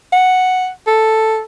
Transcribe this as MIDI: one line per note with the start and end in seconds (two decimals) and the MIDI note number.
0.13 0.69 78
0.87 1.41 69